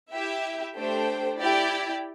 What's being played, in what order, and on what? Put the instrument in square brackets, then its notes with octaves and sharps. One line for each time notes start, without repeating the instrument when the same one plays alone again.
[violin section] E4 G4 E5
A3 D4 G4 C5 G5
E4 G4 D5 G5